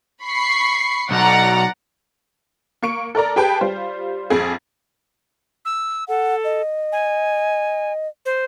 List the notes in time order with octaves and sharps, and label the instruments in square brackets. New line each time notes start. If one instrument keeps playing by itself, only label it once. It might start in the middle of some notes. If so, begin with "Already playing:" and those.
[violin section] B5 C#6 C7
[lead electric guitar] B1 [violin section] D5 F#5 A#5
[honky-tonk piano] A#3 C#6 C#7 D7
A4 A#4 D5 A#5
G4 G#4 B4 G5 A5
G3 F4 C5
A#1 F2 G#4
[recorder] E6
[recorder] A4 [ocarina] F#5
[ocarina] D#5
[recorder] G#5
C5